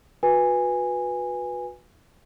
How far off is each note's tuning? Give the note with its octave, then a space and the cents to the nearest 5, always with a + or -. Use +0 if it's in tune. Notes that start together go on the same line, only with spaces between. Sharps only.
F#4 -30 B4 -10 G#5 -10